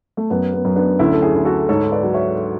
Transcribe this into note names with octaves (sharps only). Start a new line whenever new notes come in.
A3
F#2 B3
B3
F#2
B3 D4
D2 C#4 E4
A4
E4 G#4
D2
F#4 A4
G#2 A4 C#5
B4 D5
F#3
C#5 E5